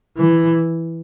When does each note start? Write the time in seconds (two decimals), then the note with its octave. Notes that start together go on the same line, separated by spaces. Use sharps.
0.17 E3